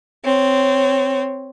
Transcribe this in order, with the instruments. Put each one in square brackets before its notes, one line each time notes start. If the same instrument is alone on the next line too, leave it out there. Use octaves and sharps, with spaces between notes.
[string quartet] C4 C#5